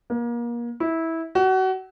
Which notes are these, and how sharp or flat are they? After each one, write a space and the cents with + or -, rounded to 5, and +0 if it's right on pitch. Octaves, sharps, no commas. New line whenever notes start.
A#3 +30
E4 -15
F#4 +30